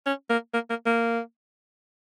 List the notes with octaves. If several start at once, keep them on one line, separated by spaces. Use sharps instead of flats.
C#4
A#3
A#3
A#3
A#3